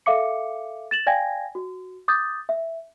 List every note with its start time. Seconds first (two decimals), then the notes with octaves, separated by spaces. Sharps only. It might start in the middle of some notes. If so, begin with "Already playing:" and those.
0.06 A4 E5 F5 D6 C#7
0.91 A6 E7 F#7
1.07 D5 F5 G5 G#5 G#6 A#6
1.55 F#4
2.08 D6 D#6 G6 A6
2.49 E5